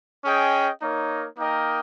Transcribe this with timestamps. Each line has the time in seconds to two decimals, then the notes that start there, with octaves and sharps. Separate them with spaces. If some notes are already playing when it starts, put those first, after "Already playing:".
0.25 C#4 G#4 D#5 G5
0.82 A#3 D#4 A#4 C#5
1.38 A#3 D#4 A#4 D#5 G5